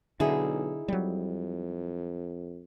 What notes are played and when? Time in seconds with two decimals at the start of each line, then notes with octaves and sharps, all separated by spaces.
0.20 B1 D3 D#4 E4 G#4
0.88 F2 F#3 G3